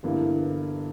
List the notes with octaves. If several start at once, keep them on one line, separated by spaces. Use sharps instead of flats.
G1 G2 E3 A#3 E4